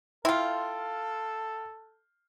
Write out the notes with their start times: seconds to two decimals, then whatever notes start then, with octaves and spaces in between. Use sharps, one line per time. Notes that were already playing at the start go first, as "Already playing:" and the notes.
0.25 E4 F4 A4 F5 G5 C6